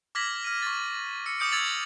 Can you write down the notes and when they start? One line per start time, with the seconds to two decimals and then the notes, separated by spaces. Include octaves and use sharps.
0.15 D6 F6 G#6 A#6 B6 F#7
0.44 F6 D#7
0.62 C#6 A6
1.26 E6 C#7
1.39 D6 D#6 G6 C#7 D7
1.52 E6 G#6 A6 F7 F#7